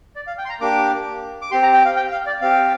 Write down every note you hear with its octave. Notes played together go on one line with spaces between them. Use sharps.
D5
F5
G5
C6
A#5
A#3 D4 G4 D6
D6
C4 G4 C6
A#5
G5
F5
G5
F5
D5
C4 G4 F5